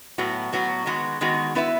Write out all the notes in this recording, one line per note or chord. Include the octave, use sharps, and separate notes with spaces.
A2 F#3 B3 F#4
A2 F#3 B3 F#4
D#3 G#3 B3 F#4
D#3 G#3 B3 F#4
B3 E4 B4 E5